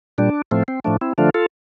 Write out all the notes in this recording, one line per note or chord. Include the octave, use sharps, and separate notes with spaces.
A#2 G3 D4
A2 F3 A3 C4
C4
A2 F3 A3 D4
C4 E4
D3 F3 A3 D4 F4
F4 A4